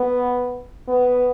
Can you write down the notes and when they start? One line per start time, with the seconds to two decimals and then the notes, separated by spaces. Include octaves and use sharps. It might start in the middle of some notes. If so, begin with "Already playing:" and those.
Already playing: B3
0.89 B3